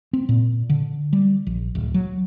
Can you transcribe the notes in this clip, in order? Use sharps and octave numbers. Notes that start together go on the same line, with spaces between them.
C4
A#2
D3
G3
A#1
D1
F#3